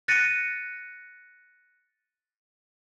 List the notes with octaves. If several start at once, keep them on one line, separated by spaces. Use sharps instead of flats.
F#6 A6 A#6 C#7 D#7